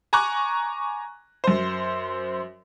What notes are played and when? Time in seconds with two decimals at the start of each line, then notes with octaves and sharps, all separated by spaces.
0.13 G#5 A#5 C#6 D6 F#6
1.44 F#2 C5